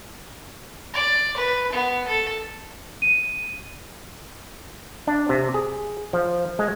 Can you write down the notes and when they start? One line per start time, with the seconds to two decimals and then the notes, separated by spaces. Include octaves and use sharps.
0.94 D5
1.37 B4
1.73 B3
2.08 A4
3.02 D#7
5.07 D4
5.29 C3
5.54 G#4
6.13 F3
6.59 G#3